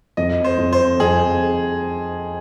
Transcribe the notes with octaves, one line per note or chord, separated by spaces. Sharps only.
F2 D#5
C5
F2
C5
F2 G#4